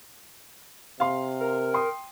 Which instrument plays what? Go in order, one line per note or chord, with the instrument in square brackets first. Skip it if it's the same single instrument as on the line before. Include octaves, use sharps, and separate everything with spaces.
[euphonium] C3 [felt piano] F5 C6
[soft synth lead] A#4
[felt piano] G5 C6 D#6